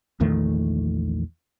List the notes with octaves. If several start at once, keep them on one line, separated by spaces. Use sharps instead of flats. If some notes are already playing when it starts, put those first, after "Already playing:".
A#1 E2 D#3 A3